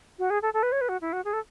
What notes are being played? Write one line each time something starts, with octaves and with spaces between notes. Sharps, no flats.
F#4
G#4
A4
A4
B4
C#5
B4
F#4
E4
F#4
G#4
A4